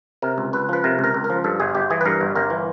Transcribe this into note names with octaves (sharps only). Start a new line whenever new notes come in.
C3 A#4
C#2
C#2 B4
F3 B4
C3 A#4
C#2 A#4
C#2
A#4
F3
G2 A4
G1 G#4
G1 G4
E3 G#4
B4
G2 A#4
G1
G1 A#4
E3